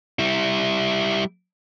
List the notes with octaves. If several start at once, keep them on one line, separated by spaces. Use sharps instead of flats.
G3 E4